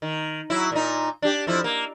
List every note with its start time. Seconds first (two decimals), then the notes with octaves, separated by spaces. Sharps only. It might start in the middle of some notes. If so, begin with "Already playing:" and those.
0.02 D#3
0.50 F#3 E4
0.72 A#2 D#4
1.22 D4 G4
1.47 F2 F3 E4
1.64 A#3